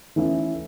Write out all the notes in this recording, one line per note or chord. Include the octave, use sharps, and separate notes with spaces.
E3 A3 C#4 E4